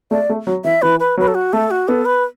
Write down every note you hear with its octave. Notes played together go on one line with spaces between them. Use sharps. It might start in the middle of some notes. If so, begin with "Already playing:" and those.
A3 D5
A3
F#3
E3 E5
E3 B4
B4
F#3 B4
A4
F#4
A3 A4
F#4
B3 A4
B4